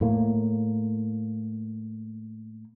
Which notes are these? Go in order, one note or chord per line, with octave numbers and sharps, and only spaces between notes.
A2 A#3